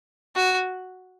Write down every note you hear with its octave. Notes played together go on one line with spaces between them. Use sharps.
F#4